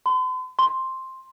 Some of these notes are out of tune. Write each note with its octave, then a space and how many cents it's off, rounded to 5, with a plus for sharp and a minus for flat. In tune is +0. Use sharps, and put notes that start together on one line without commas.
C6 -45
C6 +5